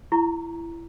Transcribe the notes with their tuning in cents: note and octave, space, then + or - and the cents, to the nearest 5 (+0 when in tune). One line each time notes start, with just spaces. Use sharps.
E4 +20 A#5 +0 C#6 +0